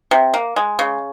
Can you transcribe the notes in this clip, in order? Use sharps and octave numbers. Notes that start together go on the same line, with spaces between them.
C3
A#3
G#3
C#3